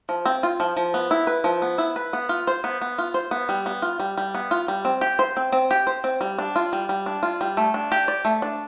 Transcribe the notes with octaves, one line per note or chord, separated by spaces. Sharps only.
F3
C4
F4
F3
F3
B3
E4
B4
F3
B3
E4
B4
B3
F4
C5
B3
B3
F4
C5
B3
G3
B3
F4
G3
G3
B3
F4
G3
C4
G4
C5
C4
C4
G4
C5
C4
G3
D4
F4
G3
G3
D4
F4
G3
A3
D4
G4
D5
A3
D4